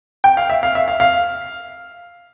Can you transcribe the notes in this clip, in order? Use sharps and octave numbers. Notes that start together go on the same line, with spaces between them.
G5
F5
E5
F5
E5
F5
F5